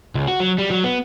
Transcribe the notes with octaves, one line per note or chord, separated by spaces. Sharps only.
C#2
F#4
F#3
G3
F#3
B3